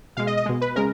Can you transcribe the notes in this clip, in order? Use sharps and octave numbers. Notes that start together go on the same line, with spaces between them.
B2 G#3 F5
D#5
D#5
B2 G#3
B4
C#3 G#3 A#4